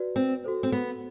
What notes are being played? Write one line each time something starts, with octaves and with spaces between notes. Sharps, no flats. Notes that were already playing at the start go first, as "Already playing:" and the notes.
Already playing: F#4 B4 D5
C4
F#4 A4 C5
C4
B3